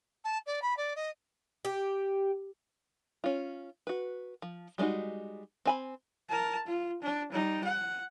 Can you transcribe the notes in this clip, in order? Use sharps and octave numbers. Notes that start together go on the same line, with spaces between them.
A5
D5
B5
D5
D#5
G4
C#4 F4
F#4 B4
F3
G3 G#3 D4 D#4 F#4
C4 G#5 B5
A#4 A5
F4
D4
G3 D#4
F#5